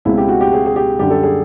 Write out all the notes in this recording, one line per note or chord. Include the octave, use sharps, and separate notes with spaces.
C#2 B2 G#3 C4 E4
G4
F#4
G4
G#4
G#4
G4
F#2 D3 G3 G4
A4
G#4